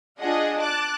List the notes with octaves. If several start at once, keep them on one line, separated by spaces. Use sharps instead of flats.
D4 F4 G#4 D#5 F#5
A5 D6 F#6